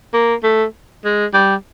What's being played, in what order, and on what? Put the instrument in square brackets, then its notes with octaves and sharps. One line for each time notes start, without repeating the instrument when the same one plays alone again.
[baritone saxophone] A#3
A3
G#3
G3